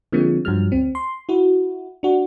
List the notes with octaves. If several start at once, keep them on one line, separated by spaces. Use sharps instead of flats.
D3 F3 G#3 A#3 C4
G2 F3 F#3 F6
D2 C4
C6
E4 F#4
D4 F#4